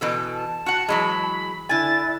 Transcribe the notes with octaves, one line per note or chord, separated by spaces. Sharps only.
B2 E3 A4
A5
F#4 F#5 C#7
E3 F#3 G#3 B5
D3 E4 G#5 A6